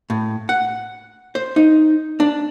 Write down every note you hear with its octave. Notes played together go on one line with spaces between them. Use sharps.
A2
F#5
C5
D#4
D4